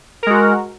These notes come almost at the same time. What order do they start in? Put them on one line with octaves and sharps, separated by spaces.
A#4 G#3 F#4